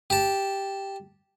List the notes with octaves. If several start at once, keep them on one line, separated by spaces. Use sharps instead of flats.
G4 A5